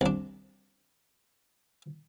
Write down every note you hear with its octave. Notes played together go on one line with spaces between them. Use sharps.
C2 D4